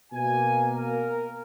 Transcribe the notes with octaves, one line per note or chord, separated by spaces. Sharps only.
B2 A#3 G#5
A#4